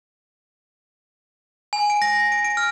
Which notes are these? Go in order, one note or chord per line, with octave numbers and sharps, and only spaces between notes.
G#5
D7
A#6
A#6
D7
D7
F6